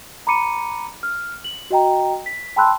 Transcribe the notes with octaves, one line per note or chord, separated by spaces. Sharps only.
A#5 B5 D6 C#7 D#7
F6
F#7
F#4 D#5 G5 A#5
B6
G5 A5 B5 C6 E6 F#6